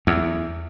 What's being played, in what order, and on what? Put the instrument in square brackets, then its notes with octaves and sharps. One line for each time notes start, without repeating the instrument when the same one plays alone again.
[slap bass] E2